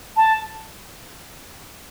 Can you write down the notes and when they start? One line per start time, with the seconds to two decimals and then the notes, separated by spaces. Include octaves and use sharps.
0.17 A5